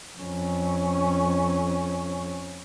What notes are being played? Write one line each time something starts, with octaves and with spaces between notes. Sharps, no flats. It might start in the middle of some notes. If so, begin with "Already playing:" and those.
F2 C#4